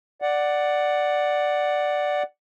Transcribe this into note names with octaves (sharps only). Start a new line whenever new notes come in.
D5 F#5